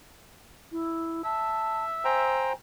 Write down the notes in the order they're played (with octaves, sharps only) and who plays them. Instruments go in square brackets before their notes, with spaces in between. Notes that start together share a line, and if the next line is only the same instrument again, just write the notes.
[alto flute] E4
[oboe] E5 [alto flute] A5
[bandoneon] C5 G5 A#5 [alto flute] G#5